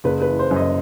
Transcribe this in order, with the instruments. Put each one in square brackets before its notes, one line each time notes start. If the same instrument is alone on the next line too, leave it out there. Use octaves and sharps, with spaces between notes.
[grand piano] F#1 B4
B4
E3
C5
F#2
D#5